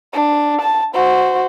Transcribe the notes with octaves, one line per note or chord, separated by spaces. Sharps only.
D4
A5
F#4 C5